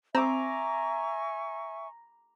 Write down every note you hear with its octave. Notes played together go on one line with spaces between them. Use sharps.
C4 E5 G#5 A#5 C#6 D6